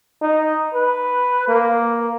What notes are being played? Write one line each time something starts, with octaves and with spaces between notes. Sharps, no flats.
D#4
B4
A#3